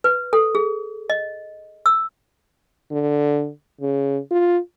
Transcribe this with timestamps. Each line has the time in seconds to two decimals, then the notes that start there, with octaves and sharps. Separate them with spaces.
0.04 B4
0.33 A4
0.55 G#4
1.10 D#5
1.86 E6
2.91 D3
3.81 C#3
4.31 F4